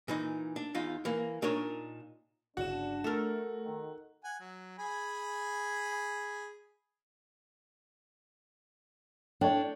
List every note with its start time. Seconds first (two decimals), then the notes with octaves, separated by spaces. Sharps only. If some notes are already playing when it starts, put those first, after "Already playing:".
0.08 A#2 E3 D#4
0.56 D4
0.75 E2 D#4 F4
1.05 E3 A#3
1.42 A#2 D4 D#4 A#4 C#5
2.57 G1 C#3 D4 F#4 E7
3.04 A3 A4 A#4
3.64 D#3
4.24 F#5 G#5
4.40 F#3
4.79 G#4 G#5 B5
9.41 D4 A4 C#5 G5